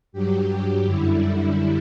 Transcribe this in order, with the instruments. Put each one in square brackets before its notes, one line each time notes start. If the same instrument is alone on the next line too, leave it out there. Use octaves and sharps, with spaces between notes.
[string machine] G2 F#3 G4
G4
F#2 D3 G3 E4